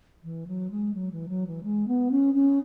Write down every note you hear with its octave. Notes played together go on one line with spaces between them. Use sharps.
E3
F#3
G#3
F#3
E3
F#3
E3
G#3
B3
C#4
C#4